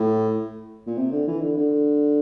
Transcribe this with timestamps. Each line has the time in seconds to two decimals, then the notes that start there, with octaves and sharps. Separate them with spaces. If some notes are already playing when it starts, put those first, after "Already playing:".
Already playing: A2
0.87 A#2
0.97 C3
1.11 D3
1.27 E3
1.41 D3
1.57 D3